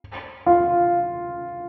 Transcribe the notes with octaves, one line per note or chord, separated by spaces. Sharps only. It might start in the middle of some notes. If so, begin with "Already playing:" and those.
F4